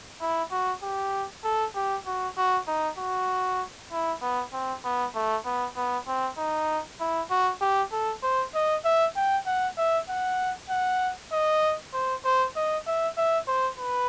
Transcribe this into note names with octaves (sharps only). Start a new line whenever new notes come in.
E4
F#4
G4
A4
G4
F#4
F#4
D#4
F#4
E4
B3
C4
B3
A3
B3
B3
C4
D#4
E4
F#4
G4
A4
C5
D#5
E5
G5
F#5
E5
F#5
F#5
D#5
C5
C5
D#5
E5
E5
C5
B4